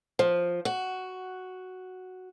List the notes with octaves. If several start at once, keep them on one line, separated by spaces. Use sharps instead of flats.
F3
F#4